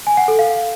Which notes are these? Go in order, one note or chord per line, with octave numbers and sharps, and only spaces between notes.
G#5
F#5
A4
F5